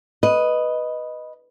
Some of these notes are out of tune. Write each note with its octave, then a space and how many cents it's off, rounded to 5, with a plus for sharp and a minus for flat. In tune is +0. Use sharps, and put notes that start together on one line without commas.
B4 +0 D#5 +0